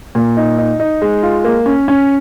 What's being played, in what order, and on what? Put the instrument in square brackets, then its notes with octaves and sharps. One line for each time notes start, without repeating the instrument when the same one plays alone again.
[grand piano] A#2
D#4
D#4
D#4
G#3
F4
A#3
C#4
C#4